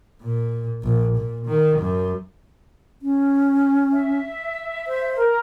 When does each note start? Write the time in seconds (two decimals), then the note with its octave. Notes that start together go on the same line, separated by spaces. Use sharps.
0.22 A#2
0.83 A#1
1.16 A#2
1.46 D#3
1.79 F#2
3.02 C#4
3.92 E5
4.87 C5
5.15 A#4